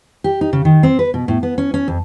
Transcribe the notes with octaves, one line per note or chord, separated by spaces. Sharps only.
G4
D#4
C#3
D#3
C4
B4
B2
A2
B3
C#4
C#4
F2